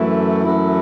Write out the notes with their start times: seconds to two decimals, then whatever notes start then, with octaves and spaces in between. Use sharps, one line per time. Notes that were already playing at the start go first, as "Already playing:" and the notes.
Already playing: F#2 E3 A3 E4
0.43 F#2 E3 A3 E4